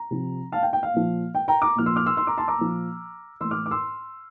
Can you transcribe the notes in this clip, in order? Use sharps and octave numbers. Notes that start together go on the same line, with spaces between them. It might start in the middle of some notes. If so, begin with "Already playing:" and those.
Already playing: A#5
C3 F3
F5 A5
G5
G5
F5
A#2 F3
G5
G5 A#5
A#5 D6
A#2 F3 F6
C6 E6
D6 F6
C6 E6
C6 E6
A#5 D6
A5 C6
A#5 D6
A#2 F3
A2 E3 C6 E6
D6 F6
D6
C6 E6